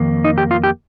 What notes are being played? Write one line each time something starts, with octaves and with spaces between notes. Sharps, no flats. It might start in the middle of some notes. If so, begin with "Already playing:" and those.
Already playing: F2 D#3 A#3
D#4
G4
F4
G4